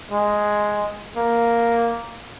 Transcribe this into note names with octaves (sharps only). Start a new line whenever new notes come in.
G#3
A#3